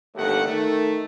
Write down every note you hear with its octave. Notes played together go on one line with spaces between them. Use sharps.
G1 D#2 A3 G4 F#5
D#3 A3